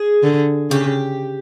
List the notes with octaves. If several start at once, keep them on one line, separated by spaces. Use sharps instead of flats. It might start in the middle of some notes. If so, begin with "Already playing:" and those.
Already playing: G#4
D3
C#3 G4